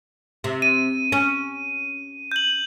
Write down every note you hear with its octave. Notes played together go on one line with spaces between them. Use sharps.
C3
D#7
C#4
G6 F#7